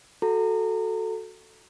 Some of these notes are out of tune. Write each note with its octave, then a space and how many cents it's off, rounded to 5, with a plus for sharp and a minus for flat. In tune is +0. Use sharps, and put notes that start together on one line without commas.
F#4 +0 A4 +0 A#5 -25